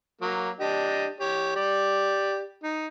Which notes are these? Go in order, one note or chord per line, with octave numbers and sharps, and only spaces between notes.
F#3 A#3
D4 G4 D#5
G4 C#5
G4 D5
D#4